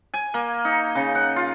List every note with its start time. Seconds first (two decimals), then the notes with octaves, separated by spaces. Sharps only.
0.14 G#5
0.34 A#3
0.65 D#4
0.95 C#3
1.15 F#5
1.36 F4